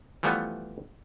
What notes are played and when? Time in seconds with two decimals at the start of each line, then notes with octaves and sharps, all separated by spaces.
0.23 E3 F3 G3 A3 B3